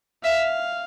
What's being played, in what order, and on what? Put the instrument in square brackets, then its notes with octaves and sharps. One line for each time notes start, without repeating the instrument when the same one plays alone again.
[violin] E5 [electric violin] F5